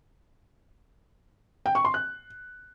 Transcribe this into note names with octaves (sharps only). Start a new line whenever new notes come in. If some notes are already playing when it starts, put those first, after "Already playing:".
G5
C#6
C6
F#6